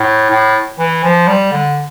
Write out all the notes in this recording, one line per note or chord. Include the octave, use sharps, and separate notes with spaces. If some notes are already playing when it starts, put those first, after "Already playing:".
Already playing: A2
A2
E3
F3
G3
D3